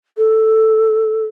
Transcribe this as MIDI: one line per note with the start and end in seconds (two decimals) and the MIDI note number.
0.17 1.25 69